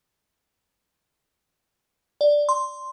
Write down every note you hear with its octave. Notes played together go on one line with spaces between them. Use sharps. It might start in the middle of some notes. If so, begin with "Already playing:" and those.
D5
C6